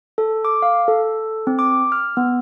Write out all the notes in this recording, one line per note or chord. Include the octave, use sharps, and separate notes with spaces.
A4
D6
F5
A4
C4
D6
F6
B3